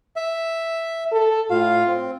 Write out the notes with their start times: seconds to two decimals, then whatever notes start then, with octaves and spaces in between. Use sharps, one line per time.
0.16 E5
1.12 A4
1.50 A2 F4 F5
1.87 C4